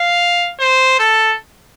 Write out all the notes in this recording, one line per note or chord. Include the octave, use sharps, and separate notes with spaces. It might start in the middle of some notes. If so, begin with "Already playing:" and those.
Already playing: F5
C5
A4